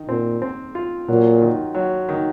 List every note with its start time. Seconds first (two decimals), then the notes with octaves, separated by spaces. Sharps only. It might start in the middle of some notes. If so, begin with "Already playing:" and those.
Already playing: D#3
0.08 A#2 C4
0.42 C4
0.75 F4
1.08 A#2 F#3
1.42 D#3
1.75 F#3
2.09 D#3